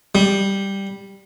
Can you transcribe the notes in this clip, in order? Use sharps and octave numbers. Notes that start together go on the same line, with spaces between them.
G3